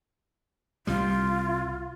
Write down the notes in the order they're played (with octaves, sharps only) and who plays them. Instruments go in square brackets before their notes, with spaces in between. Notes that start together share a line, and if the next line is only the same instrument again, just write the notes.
[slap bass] C2 G3 [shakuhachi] F4